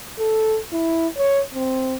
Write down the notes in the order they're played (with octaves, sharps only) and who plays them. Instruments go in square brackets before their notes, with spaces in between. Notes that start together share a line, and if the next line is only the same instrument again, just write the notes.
[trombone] A4
E4
C#5
C4